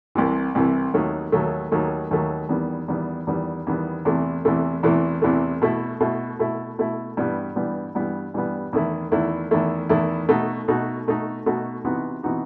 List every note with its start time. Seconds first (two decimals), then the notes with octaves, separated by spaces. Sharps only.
0.15 C2 C3 E3
0.55 C2 C3 E3
0.94 D#2 D#3 F#3 A3
1.32 D#2 D#3 F#3 A3
1.72 D#2 D#3 F#3 A3
2.11 D#2 D#3 F#3 A3
2.49 E2 D#3 G3 B3
2.88 E2 D#3 G3 B3
3.27 E2 D#3 G3 B3
3.67 E2 D#3 G3 B3
4.05 E2 C3 E3 A3
4.45 E2 C3 E3 A3
4.83 E2 C3 E3 A3
5.22 E2 C3 E3 A3
5.62 B2 A3 E4
6.00 B2 A3 E4
6.39 B2 A3 E4
6.79 B2 A3 E4
7.17 G2 E3 G3 B3
7.56 G2 E3 G3 B3
7.95 G2 E3 G3 B3
8.34 G2 E3 G3 B3
8.73 E2 D#3 A3 E4
9.12 E2 D#3 A3 E4
9.51 E2 D#3 A3 E4
9.89 E2 D#3 A3 E4
10.28 B2 A3 D#4 F#4
10.68 B2 A3 D#4 F#4
11.07 B2 A3 D#4 F#4
11.46 B2 A3 D#4 F#4
11.84 C3 E3 B3 D#4 F#4
12.23 C3 E3 B3 D#4 F#4